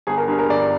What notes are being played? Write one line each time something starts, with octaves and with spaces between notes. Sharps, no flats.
G1 G#4
A#4
G2 G#4
A#4
G1 D5